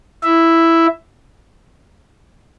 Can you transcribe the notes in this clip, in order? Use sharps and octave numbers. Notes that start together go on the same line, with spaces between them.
E4 E5